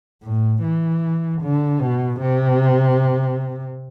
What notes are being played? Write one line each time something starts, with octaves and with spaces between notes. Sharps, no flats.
A2
E3
D3
B2
C3